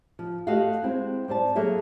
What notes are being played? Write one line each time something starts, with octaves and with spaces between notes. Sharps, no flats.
F3
A3 F#4 G4 D#5 F5 F#5
G#3 C4 E4
G3 C5 D5 A5
F#3 A#3 G#4 A4 E5